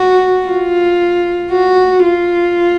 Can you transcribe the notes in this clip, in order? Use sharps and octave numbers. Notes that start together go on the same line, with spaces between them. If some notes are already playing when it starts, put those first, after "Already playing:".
Already playing: F#4
F4
F#4
F4